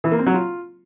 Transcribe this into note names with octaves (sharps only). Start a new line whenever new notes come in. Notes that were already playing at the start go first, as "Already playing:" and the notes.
E3
A#3
C4
F#3
F4